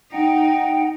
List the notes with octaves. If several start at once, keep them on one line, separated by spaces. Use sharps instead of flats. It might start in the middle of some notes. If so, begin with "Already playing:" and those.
D#4 F#5 G5